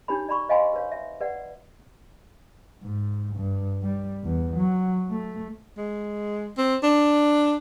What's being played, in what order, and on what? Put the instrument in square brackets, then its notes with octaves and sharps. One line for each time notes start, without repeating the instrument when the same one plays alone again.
[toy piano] D4 D#4 G4 A#4 C#5 B5
D5 A#5 B5 C#6
C5 D#5 F5 G#5 B5 C6
B4 C#5 F5
E5
B4 D5 F#5
[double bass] G#2
G2
G3
E2
F#3
A3
[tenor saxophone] G#3
C4
D4